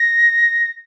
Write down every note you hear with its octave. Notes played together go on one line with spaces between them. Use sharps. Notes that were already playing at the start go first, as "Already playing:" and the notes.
Already playing: A#6